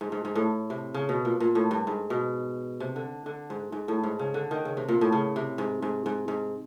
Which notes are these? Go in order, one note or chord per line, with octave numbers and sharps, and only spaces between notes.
G#2
G#2
G#2
A2
C3
C#3
B2
A#2
A#2
A2
G2
G#2
B2
C3
D3
D3
G#2
G#2
A2
G#2
C#3
D3
D#3
C#3
C3
A#2
A2
C#3
C3
G#2
G#2
G#2
G#2